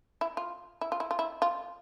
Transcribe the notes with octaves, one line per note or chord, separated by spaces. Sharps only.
E4
F4
E4
F4
E4
F4
E4
F4